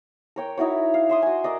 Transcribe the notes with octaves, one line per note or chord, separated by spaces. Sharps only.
A#4 C#5 G5
D#4 E4 F#4 C#5
F5
E5 C6 D#6
F#4 G#5
A#4 D5 D#5